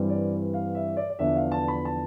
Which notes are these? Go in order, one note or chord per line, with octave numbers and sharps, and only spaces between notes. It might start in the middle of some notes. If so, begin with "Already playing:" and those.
Already playing: G2 E3 G3 C4
D5
F5
E5
D5
D5
E2 D3 F3 B3 D4 E5
F5
A5
B5
A5